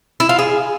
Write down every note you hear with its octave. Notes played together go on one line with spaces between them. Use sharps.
E4
F4
G#4